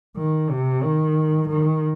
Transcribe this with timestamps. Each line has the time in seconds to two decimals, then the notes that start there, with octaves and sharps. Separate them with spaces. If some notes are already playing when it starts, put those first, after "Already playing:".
0.17 D#3
0.50 C3
0.84 D#3
1.49 D#3